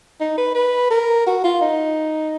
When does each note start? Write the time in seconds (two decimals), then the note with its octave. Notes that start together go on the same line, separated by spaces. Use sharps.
0.20 D#4
0.38 B4
0.55 B4
0.91 A#4
1.26 F#4
1.44 F4
1.61 D#4